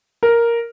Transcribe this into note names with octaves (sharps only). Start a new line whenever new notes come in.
A#4